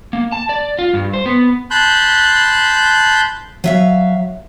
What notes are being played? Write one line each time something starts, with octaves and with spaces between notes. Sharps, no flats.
A#3
A5
D5
F4
G2
C5
B3
A5 B5 C6 F#6 G6
F#3 E5 F5